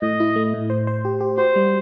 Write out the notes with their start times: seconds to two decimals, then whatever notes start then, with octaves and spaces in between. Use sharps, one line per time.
0.02 A2 D#5
0.20 E4
0.36 A3
0.54 A2
0.70 C5
0.87 C5
1.05 G4
1.21 G4
1.38 F#4 C5
1.56 G3